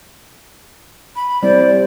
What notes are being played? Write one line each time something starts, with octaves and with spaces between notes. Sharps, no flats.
B5
G3 C4 E4 C5 D5